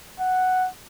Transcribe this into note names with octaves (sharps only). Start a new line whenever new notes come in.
F#5